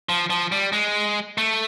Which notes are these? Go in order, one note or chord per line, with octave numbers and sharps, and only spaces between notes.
F3
F3
G3
G#3
A3